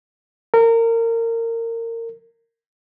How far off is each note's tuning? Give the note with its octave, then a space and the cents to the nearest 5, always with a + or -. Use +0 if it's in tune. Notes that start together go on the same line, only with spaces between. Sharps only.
A#4 -25